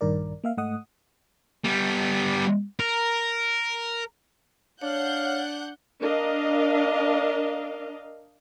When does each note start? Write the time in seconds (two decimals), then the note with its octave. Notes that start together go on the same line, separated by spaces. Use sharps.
0.01 A#1 G2 D#3 A#4 D5
0.44 A#3 E5 F5
0.57 G#2 A3 D#5 F#5 D#6
1.64 G3 B3
2.80 A#4
4.81 D4 C#5 F5 F#5 F#6 G6
6.01 D4 A#4 D#5 F5